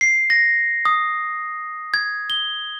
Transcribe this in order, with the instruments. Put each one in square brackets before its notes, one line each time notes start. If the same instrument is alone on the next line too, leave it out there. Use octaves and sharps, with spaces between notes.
[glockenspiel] C7
A#6
D#6
G#6
G7